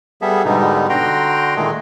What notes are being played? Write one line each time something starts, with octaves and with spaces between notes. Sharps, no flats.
G3 B3 G#4 A4 E5
G#2 B2 D3 G3 B3 D#4
D3 F#4 G5 A#5 C6
A#2 D#3 G#3 A3 G#4 A4